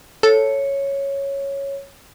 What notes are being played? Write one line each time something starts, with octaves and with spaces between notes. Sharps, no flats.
A4 C#5